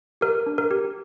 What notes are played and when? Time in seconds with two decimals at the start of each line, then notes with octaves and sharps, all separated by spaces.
0.21 G4 A#4
0.46 D4
0.58 A#4
0.71 G4